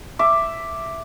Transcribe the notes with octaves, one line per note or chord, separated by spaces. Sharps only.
E5 D6